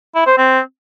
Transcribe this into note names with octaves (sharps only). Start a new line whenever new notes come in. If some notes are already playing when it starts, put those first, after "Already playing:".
E4
C5
C4